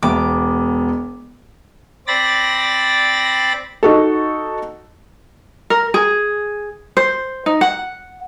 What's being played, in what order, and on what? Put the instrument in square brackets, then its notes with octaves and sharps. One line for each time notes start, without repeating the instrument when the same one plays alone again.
[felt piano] E1 B3 [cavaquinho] D6
[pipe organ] C4 D5 B5 A6 A#6
[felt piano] D#4 F#4 A4
[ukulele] A#4
G#4
C5
D#4
F#5